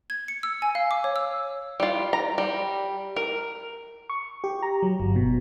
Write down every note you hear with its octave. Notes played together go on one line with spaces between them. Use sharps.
G#6
C#7
E6
G#5
F5
D6
C#5
E6
G3 F4
A#5
G3
A#4
C#6
G4
A#5
F#3
G1
B2